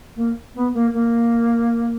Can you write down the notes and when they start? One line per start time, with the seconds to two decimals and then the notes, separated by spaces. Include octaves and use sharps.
0.16 A#3
0.55 B3
0.74 A#3
0.93 A#3